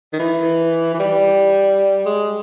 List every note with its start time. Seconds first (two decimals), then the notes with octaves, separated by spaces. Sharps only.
0.13 D#3
0.20 E3
0.94 E3
0.99 G3
2.06 G#3